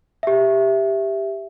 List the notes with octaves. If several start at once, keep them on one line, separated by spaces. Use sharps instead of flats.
G4 E5